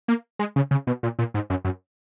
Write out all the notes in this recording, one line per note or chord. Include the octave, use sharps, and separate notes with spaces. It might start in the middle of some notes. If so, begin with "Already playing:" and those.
A#3
G#3
C#3
C#3
B2
A#2
A#2
G#2
F#2
F#2